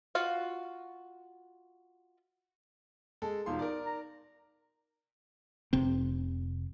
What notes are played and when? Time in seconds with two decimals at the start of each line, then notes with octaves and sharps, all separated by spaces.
0.15 F4 F#4 F5
3.22 G#3 A4
3.46 E1 D#4 F4 C6
3.59 A#4 D5
3.86 A#5
5.73 F1 C3 C4